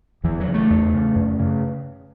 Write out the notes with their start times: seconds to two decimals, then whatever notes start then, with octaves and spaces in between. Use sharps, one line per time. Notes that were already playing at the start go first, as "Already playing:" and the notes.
0.24 E2 E3
0.40 F#3
0.47 C#3
0.54 A3
0.70 E2
0.94 C#3
1.15 F#2
1.39 C#3